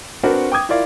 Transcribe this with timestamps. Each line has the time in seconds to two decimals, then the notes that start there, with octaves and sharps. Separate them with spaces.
0.23 C4 D4 F#4 A#4 B4 F#5
0.52 G5 D6 D#6 G#6
0.69 E4 F4 A#4 D5 F5